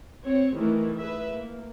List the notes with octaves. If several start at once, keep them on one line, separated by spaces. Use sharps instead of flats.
C4 C#5
D#3 E3 A3
G#4 B4 E5
A#3